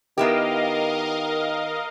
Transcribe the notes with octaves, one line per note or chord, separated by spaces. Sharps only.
D#3 B3 E4 G4 A#4 D#5 F5